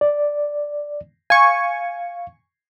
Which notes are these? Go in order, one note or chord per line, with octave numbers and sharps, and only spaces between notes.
D5
F5 G#5 C#6